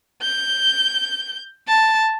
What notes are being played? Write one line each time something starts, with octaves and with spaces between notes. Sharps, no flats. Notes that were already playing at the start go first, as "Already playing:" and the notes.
G6
A5